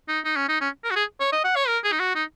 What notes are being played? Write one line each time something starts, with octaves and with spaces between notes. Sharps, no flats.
D#4
D#4
C#4
D#4
C#4
A#4
F#4
G#4
C#5
D#5
F#5
C#5
A#4
G#4
D#4
F#4
D#4